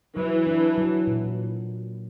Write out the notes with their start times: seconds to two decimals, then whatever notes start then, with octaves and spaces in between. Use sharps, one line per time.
0.17 E3 F#3
0.47 D4
0.78 F#3
1.07 A#2